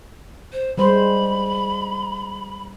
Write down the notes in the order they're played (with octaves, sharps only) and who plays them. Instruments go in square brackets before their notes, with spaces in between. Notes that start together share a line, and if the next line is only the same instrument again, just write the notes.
[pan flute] C5
[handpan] G3 G#3 C5 [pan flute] B5